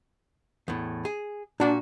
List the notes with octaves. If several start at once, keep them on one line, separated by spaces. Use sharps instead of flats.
E2 A2
G#4
A#2 D4 F#4